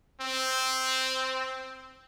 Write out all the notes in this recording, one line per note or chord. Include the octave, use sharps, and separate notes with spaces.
C4